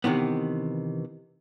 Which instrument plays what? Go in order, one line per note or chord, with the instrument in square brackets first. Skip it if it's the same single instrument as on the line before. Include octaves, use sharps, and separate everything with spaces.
[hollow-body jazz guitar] C3 D#3 E3 B3